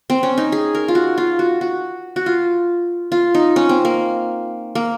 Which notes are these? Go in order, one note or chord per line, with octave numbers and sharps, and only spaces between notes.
C4
C#4
D#4
G#4
A#4
F4
F#4
F4
F#4
F#4
F#4
F4
F4
D#4
C#4
C4
A#3
A#3